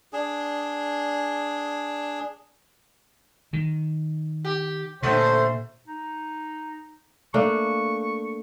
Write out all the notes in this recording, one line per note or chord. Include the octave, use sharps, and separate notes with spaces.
D4 G#4
D#3
G4
A#2 D3 A3 C#4 C5
D#4
A3 A#3 D4 C#6